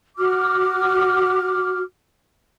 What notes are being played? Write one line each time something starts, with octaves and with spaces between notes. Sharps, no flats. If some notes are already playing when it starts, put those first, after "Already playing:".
F#4 D6 F6